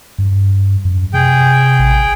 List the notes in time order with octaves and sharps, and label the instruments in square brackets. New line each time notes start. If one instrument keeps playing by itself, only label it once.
[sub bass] G2
F#2
[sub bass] C3 [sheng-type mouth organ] G#4 G5
[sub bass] A1